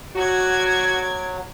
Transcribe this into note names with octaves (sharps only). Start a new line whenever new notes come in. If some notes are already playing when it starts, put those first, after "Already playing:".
F#3 F#4 D5 G#6